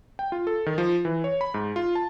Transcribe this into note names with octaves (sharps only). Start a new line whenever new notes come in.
G5
F4
A4
D#3
F3
E3
C#5
B5
G#2
F4
A5